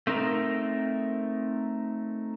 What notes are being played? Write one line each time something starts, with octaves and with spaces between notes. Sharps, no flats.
A3 C4 D#4 A#4